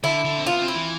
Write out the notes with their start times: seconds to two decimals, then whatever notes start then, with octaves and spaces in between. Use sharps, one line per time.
0.03 D3 E4
0.25 D3
0.38 C4
0.46 B3 F4
0.61 C4
0.68 E4
0.75 E3